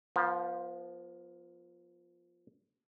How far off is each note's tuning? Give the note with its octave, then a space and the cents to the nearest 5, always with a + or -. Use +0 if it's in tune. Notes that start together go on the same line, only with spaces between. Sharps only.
F3 +0 B3 -40